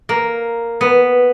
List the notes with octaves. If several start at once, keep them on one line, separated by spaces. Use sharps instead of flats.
A#3
B3